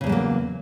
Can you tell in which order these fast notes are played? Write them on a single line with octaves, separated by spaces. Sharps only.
C#3 E2 G#3 F#3 A#3